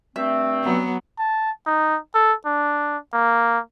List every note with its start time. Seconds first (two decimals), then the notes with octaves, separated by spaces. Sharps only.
0.16 G2 A3 C4 E5
0.63 F#3 B3
1.19 A5
1.66 D#4
2.15 A4
2.46 D4
3.13 A#3